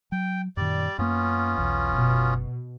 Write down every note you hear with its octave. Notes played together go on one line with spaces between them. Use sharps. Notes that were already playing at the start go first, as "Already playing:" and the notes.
F#3 G5
F#2 A#2 D#3 G3 D5
F#2 A#3 B3 C#4 F4
B1 E2
F#1 B2